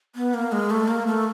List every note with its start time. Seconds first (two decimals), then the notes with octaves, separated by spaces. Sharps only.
0.15 B3
0.34 A#3
0.52 G#3
0.70 A3
0.88 A#3
1.07 A3